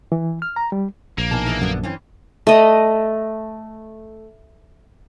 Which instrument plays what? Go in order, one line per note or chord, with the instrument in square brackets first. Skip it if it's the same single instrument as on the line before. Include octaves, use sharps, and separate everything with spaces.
[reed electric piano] E3
F6
A#5
G3
[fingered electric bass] A#1 [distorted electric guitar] A#3
[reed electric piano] B2 D#4 G#5 [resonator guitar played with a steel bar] A#4 A5
[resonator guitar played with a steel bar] E3 G3 G#3
[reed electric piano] F#2 [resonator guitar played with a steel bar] D3 B3
[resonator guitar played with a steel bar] E3 C4 C#4
[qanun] A3 D#5